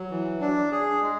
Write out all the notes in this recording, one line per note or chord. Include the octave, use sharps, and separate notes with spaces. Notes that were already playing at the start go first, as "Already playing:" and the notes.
Already playing: F#3
E3
D4
G#4
G#3